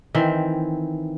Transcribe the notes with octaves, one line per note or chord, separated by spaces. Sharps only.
D#3 E3 C4